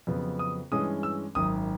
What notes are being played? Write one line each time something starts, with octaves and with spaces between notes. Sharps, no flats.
F2 C#3 F#3 B3
D#6
G2 E3 G#3 C#4 D#6
E6
G#1 F#2 D#3 D#6